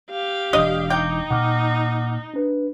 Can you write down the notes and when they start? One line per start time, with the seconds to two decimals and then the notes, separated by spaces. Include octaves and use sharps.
0.10 G4 F5
0.53 E1 E2 D4 D5 D#5 D#6
0.90 D#4 G5 D6
1.30 A#2 F#5 D6 F6
2.34 D4 B4